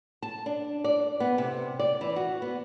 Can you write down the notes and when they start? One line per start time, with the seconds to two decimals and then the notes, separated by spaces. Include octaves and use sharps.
0.22 A5
0.46 D4
0.84 D5
1.20 B3
1.38 C3
1.79 D5
2.01 E3
2.16 F#4
2.42 B3